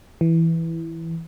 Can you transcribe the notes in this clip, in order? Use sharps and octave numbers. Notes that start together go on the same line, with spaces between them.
E3